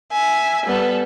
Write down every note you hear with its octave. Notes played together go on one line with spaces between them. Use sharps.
E5 G#5
G3 B3 A4